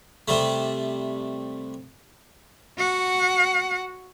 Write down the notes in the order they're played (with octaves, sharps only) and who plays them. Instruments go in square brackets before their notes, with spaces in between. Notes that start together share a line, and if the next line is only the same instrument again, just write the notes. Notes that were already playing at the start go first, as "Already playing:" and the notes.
[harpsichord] C3 G3 A3
[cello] F#4 F#5